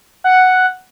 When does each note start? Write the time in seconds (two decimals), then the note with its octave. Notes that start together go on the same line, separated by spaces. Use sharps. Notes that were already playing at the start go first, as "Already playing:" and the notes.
0.24 F#5